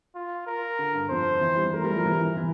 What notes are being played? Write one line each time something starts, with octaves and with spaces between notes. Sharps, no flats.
F4
A#4
D3
G2
F2 C5
E3
G3
A3 A#4
G3
F3
E3
E3
E3